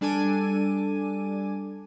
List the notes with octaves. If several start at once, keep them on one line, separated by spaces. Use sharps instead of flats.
G3 D4 A4 G#5 D6 D#7